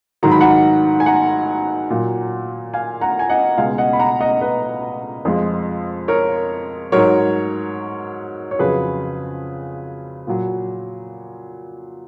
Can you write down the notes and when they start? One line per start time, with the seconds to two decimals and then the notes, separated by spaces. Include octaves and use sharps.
0.23 G#2 D#3 F#3 A#5
0.31 B5
0.40 F#5 A#5
1.00 G#5
1.06 F#5 A#5
1.90 A#2 F#3
2.74 F5 G#5
3.01 F#5 A#5
3.19 G#5
3.29 D#5 F#5
3.58 C#2 B2 G#3 F5 G#5
3.78 D#5 F#5
3.93 B5
3.99 F#5 A#5
4.20 D#5 F#5
4.41 B4 D#5
5.25 F2 F3 G#3
6.08 A#4 C#5
6.92 G#2 F#3 A#4 C#5
8.51 C#5
8.59 F2 C#3 F#3 G#4 B4
10.27 A#2 F#3